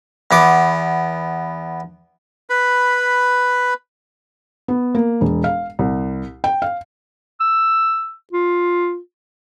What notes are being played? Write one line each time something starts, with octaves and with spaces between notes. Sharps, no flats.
E2 B3 D6
B4 B5
B3
A#3
E1
F5
C2
G5
F5
E6
F4